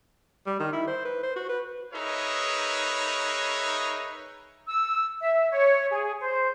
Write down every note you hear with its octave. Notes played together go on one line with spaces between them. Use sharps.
G3
D#3
E4
C5
B4
C5
F#4
B4
D#4 G#4 A#4 B4 C#5 E5
E6
E5
C#5
G#4
C5